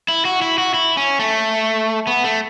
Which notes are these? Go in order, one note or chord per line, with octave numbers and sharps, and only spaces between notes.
E4
F#4
E4
F#4
E4
C#4
A3
B3
A3